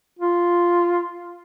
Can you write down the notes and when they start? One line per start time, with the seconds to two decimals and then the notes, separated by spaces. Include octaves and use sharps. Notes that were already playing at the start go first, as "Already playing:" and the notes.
0.19 F4